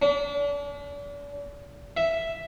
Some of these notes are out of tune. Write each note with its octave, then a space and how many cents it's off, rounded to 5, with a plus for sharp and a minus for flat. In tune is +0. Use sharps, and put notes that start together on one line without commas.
D4 -40
E5 +0